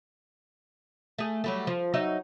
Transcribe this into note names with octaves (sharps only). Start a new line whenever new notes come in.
A3 G#4
F#3 G3 A3
F3
F#3 D#4 E5